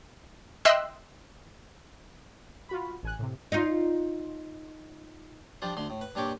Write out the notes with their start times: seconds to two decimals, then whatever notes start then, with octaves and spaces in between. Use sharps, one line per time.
0.65 D#5 E5 G5 C6 E6 F#6
2.69 F4 F#4 B5
3.03 A1 G#5 F#6
3.19 A2 C3
3.52 D#4 F4
5.62 F3 G3 D4 F4
5.77 D2 D3 C6
5.90 A2
6.01 B4
6.15 G2 A#2 D4 G4 C#5 D6